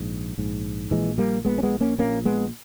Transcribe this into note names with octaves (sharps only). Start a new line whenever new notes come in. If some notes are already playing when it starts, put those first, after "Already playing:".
Already playing: A#1 G#2
A#1 G#2
A#1 A#2 E3 G#3
G3 A#3
A#1 A#2 G#3 B3
C#4
G#3 B3
A#3 C#4
A#1 A#2 A#3 C#4
G#3 B3